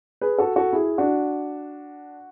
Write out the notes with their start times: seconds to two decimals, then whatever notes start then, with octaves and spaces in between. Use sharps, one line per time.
0.21 G#4 B4
0.38 F#4 A4
0.56 F#4 A4
0.73 E4 G#4
0.98 D4 F#4